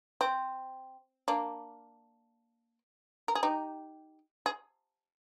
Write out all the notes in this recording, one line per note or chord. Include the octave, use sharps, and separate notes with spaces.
C4
A#3 D4
A#4
G#4
D#4 G4
G#4